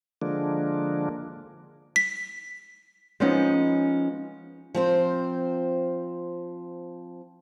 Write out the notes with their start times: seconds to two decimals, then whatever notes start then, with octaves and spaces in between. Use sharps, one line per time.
0.22 D3 F3 G#3 A#3 D4
1.96 B6
3.20 F3 G#3 B3 C#4 D#4
4.74 F3 C4 C5